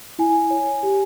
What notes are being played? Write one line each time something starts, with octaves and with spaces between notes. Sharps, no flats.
E4 G#5
C#5
G4